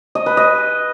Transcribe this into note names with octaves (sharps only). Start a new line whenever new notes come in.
D#5
B4
D#5